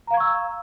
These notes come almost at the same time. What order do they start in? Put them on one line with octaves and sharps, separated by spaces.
A#5 F5 G#6 C#6 E6